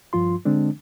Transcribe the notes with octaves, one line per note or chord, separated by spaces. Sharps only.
G2 F3 F4 C6
D3 G#3 C4 D4